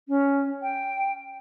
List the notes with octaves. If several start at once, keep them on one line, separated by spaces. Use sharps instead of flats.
C#4
G5